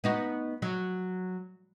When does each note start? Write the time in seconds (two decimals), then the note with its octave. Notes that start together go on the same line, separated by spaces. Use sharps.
0.04 B3 D#4 F#4
0.62 F#3